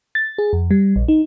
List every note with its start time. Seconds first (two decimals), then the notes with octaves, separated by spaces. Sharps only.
0.15 A6
0.38 G#4
0.53 F2
0.71 G3
0.96 A#1
1.08 D#4